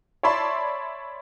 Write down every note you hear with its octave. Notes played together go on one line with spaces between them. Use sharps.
C#5 D5 E5 A5 B5 C6